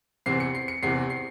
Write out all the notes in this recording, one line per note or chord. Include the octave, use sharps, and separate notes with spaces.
E2 C3 E3 C4 C7
C#7
C7
C#7
E2 C3 E3 C4 C7
C7